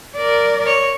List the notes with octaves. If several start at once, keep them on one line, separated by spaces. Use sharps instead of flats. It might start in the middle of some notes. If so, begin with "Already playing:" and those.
A#4 D5
C#5